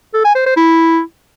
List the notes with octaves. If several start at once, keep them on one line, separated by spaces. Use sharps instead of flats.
A4
G#5
C5
C5
E4